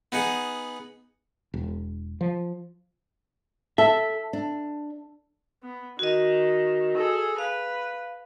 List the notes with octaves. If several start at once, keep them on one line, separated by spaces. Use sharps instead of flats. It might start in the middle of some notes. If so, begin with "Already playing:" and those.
B3 D#4 G#4 F#5
E1
F3
A4 E5
D4
B3
D#3 F#4 D#5
G#4 A4
B4 F5